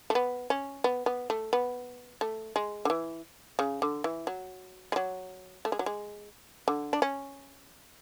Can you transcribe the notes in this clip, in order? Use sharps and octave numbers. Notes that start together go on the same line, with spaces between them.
A3
B3
C#4
B3
B3
A3
B3
A3
G#3
D3
E3
C#3
D3
E3
F#3
G#3
F#3
A3
G#3
F#3
G#3
D3
D4
C#4